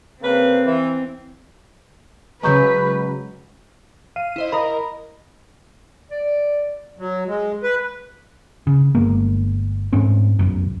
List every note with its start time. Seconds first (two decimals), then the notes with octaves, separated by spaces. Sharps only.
0.22 C#3 A#3 C4 B4
0.66 E3
2.43 C#3 F#3 G#3 B4 A#5 C#6 G6
4.16 F5 D#7
4.36 E4 C5 D#5
4.52 A#4 D#5 A#5 B5
6.11 D5
6.99 F#3
7.27 G#3
7.63 B4
8.67 C#3
8.95 G1 G#3 A#3
9.93 G#2 A3 C4 C#4
10.39 F1 B1 F#2